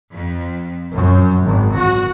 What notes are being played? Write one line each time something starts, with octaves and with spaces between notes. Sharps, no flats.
F2
F#2
G#1
F#4